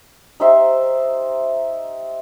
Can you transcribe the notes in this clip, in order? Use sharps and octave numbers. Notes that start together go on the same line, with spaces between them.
D#4 G4 C5 E5